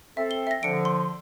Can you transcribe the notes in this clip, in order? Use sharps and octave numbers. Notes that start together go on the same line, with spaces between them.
C4 A4 E5
G7
E5 A#6
D3 F3 C#7 D7
C6